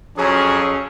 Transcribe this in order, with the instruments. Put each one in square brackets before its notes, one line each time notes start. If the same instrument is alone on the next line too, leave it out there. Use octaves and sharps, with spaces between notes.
[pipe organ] F2 [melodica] F#3 [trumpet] C#4 [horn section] G#4